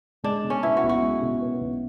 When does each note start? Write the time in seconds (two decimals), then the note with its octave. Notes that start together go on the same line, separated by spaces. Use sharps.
0.24 G#3 D4
0.43 B2
0.50 C#4
0.63 B3 E4
0.77 F#4
0.83 B1
0.89 F#4
1.02 G#3
1.22 B2
1.42 B3
1.61 B1